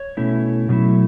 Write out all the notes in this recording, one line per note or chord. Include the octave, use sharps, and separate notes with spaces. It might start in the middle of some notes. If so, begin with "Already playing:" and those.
Already playing: C#5
B2 A3 C#4 E4
B2 F#3 A3 E4